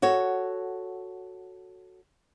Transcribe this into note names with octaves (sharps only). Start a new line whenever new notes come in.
F#4 A4 C#5